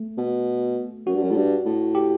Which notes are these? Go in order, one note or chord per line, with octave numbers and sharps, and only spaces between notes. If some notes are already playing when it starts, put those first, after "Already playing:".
Already playing: A3
B2
F#2 F#4
G2
F#2
A2
G2
A2
G4